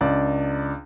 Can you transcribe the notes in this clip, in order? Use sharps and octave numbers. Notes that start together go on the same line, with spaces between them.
C#2 D4 D5